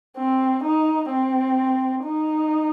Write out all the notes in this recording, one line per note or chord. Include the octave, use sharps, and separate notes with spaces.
C4
D#4
C4
D#4